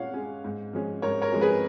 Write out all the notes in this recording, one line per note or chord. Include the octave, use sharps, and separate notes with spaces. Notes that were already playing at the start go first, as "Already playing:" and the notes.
Already playing: A#2 G#3 C#4 C#5 F5 F#5
G#3 C#4
G#2
F3 G#3 C#4
G#2 A#4 C#5
A#4 C#5
F3 G#3 C#4
G#4 B4